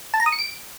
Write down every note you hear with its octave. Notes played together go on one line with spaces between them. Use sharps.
A5
A#5
D#6
C#7
D7